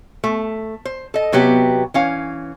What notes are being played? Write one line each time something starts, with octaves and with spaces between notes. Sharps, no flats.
A3
C5
A4 D#5
C3 F#3 B3 G4
E3 C#4 F5